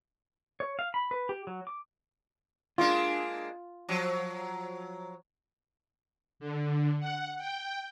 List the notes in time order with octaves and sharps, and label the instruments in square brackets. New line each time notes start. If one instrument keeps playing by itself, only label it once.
[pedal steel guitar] C#5
F5
B5
B4
G4
F#3
D6
[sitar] G#3 A#3 D4 [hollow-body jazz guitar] F4
[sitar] F3 F#3
[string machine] D3
F#5
G5